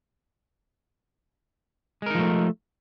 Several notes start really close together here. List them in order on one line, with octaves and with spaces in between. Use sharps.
G#3 A#4 D#4 F3 A3